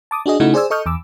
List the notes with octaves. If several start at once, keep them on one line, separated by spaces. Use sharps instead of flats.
A5 D6 D#6
D4 F#4 G#4 D#5
C#3 A3 D#4 E4 F#4
G#4 C5 D5 G#5 E6
A4 D#5 C#6 D#6 F6 G6
E2 D6 E6